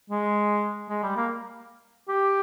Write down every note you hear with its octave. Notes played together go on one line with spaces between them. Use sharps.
G#3
G#3
G3
A#3
G4